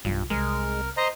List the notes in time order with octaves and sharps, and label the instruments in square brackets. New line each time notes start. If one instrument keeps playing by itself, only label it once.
[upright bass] B1 F4 [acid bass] G2
[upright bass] C2 C4 [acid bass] G#3 [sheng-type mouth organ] A#4
[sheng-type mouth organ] C5 D#5 A#5